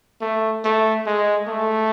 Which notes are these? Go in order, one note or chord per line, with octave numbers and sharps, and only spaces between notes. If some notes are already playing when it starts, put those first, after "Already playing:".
A3
A3
G#3
A3